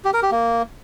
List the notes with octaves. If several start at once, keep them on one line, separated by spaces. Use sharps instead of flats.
G4
A#4
G4
A#3